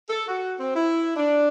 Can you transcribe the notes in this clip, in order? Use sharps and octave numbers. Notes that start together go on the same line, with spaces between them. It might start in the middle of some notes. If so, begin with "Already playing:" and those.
A4
F#4
C4
E4
D4